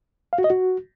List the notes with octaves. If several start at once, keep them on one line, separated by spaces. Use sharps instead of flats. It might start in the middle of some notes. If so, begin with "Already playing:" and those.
F5
F#4
D#5
F#4